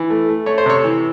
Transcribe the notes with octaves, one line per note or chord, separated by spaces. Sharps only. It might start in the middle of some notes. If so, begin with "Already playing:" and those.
Already playing: E3
A3
A3
A3 C#5
C5
C3 C#5
E3